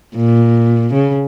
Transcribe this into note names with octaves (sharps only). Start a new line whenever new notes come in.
A#2
C#3